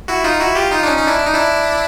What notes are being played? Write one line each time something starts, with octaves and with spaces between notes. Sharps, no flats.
E4 F#4
D#4 F4
E4 F#4
F4 G4
D#4 F4
D4
C#4 D#4
C#4 D#4
D4 E4
D4
D#4
D4 E4